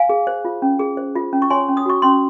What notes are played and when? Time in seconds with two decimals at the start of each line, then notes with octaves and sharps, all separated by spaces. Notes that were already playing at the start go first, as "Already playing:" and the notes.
Already playing: F5 G#5
0.09 G#4
0.27 C5
0.45 F4
0.62 C#4
0.79 G#4
0.97 C5
1.16 F4
1.33 C#4
1.42 C#6
1.50 C#5 G#5 C6
1.68 C#4
1.77 D#6
1.86 F#4 C#6
2.02 C#4 C6